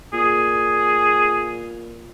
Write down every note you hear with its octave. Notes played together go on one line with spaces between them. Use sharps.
A#2 G#4